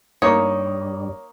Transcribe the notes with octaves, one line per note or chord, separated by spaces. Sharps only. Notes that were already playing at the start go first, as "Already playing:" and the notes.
G2 G3 A#3 D#4 C#5 C#6 D#6